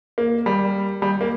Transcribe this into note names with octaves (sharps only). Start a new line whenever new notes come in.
A#3
G3
G3
A#3